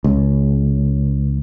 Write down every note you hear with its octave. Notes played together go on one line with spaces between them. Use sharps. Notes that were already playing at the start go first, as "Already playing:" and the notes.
C#2